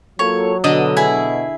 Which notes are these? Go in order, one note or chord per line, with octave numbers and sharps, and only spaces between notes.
F#3 A#3 F4 A4 C#5
B2 D3 D#5
E4 G#4